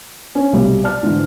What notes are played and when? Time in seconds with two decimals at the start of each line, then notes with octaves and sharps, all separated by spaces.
0.35 C#4
0.53 B1 C3 G3
0.84 D5 A5 F6
1.03 G#2 D3 E3